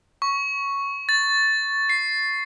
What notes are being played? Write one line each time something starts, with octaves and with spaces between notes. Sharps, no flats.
C#6
A6
C7